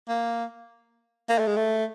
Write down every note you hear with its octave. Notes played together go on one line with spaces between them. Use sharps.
A#3
A#3
A3
G#3
A3